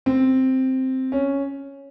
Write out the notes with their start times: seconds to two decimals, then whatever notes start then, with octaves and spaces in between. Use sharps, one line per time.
0.06 C4
1.12 C#4